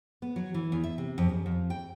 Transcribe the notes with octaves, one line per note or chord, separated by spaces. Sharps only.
B3
F#3
E3
E2
E5
C3
F2
F#2
F2
G5